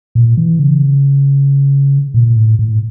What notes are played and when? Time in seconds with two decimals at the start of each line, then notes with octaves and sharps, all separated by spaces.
0.15 A#2
0.37 E3
0.59 C#3
2.14 A#2
2.36 A2
2.59 A2